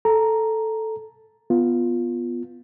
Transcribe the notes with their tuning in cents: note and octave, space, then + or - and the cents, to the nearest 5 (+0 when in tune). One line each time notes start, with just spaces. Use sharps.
A4 +0 A#5 +0
B3 +0 F4 +0